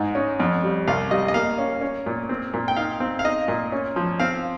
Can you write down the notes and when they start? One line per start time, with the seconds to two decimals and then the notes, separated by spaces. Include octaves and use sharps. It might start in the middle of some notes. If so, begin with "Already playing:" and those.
Already playing: G#2 D#4
0.15 C#4
0.40 F2
0.64 G3
0.88 C2 F5
1.11 G3 D#5
1.28 D#5
1.34 A#3 F5
1.58 C#4
1.81 C#4
2.06 A#2
2.29 C4
2.54 A#2
2.68 G5
2.77 D#4 F5
3.00 C4
3.19 F5
3.24 D#4 D#5
3.48 A#2
3.72 C#4
3.96 F3
4.20 C4 F5